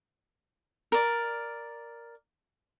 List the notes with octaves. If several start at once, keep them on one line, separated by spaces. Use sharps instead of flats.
A#4 D5